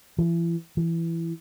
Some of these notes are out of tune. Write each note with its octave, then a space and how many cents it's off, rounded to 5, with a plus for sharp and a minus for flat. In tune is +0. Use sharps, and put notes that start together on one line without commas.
E3 +35
E3 +15